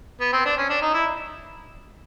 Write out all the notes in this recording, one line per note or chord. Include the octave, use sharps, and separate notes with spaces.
B3
C4
D4
C#4
D4
D#4
E4